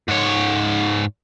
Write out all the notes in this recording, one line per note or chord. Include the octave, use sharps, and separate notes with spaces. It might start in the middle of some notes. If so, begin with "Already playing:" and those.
G#2 C#5